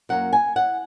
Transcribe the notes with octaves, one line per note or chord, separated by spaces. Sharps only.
F#2 F#3 A#3 F#5
G#5
F#5